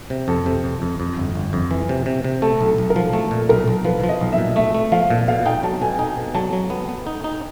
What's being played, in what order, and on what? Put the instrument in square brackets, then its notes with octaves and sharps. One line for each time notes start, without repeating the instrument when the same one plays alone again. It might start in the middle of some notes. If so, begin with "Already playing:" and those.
[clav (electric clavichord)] C3
[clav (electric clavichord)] F2 [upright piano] A4
[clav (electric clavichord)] C3
F2
F2
F2
G1
G1
F2
E3
C3
C3
C3
[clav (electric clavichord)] A3 [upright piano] A4
[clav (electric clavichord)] B1
[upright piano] A4
[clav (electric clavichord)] B1
[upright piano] A#4
[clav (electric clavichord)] F3
[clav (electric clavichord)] A3 [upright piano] A4
[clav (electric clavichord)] A#2
[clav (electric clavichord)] B1 [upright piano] A#4
[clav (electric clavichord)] B1
[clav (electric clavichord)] F3 [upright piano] B4
[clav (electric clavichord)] F3
[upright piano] D#5
[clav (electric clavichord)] B1
[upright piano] E5
[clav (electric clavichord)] A#2
[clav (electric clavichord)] A3 [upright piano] E5
[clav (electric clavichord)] A3
[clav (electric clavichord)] F3 [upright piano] F5
[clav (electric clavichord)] A#2
[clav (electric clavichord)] B2 [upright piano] F5
[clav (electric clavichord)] D#4 [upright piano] G5
[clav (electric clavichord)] F#3 [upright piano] A5
[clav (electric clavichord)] B2 [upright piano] G#5
[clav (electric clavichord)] D#4 [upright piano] G#5
[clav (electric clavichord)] B2
[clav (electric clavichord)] F#3 [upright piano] A5
[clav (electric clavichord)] F#3
B3
B3
D#4
D#4